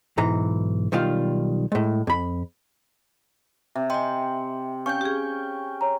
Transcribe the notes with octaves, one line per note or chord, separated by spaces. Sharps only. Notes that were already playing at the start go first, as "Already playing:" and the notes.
B1 G#2 E3 A#5
B1 D#3 G3 F4 F5
A2 G#3
F2 B5
C3 E5
D#5 G5 G#5 C6
C#4 F5 G5 C#6 G6
G4 G#4
C#5 A#5